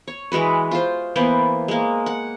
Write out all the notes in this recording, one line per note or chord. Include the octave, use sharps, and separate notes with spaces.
C#5
E3 G#3 F#4 B4
F4 C5
E3 A#3 B3 C5
G#3 A#3
F#5